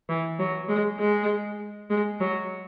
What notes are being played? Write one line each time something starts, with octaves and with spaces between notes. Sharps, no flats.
E3
F#3
G#3
G#3
G#3
F#3